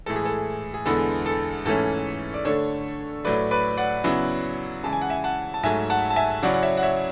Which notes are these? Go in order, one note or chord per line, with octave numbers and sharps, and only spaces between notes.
A2 E3 G#3 A4
G#4
A4
G#4
E2 D3 G#3 B3 E4 A4
A4
G#2 E3 A3 C#4 A4
D5
D3 A3 D4 A4 C#5
A2 F#3 A3 B4 D5
B4 D5
D5 F#5
C#3 F#3 B3 E4
C#3 E3 G#3 A5
G#5
F#5
E5 G#5
F#5 A5
A5
G#2 F#3 A3 E5 G#5
F#5 A5
A5
E5 G#5
C#3 F#3 C#4 E4 D5 F#5
F#5
C#5 E5
F#5
C#5 E5